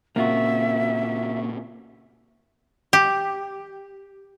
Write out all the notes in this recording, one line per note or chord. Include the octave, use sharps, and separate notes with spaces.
A#2 C#3 A#3 C4 F4 F#4 E5
G4